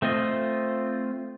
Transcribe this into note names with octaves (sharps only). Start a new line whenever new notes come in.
A3 C4 F4 D#5